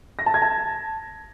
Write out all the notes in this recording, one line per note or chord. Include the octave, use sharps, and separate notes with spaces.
A#6
A5
G#6
A5